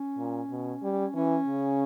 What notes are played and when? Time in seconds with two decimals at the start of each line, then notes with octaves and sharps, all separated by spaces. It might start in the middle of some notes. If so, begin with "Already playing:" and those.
Already playing: C#4
0.18 A#2
0.50 B2
0.83 G3
1.15 E3 C#4
1.47 C#3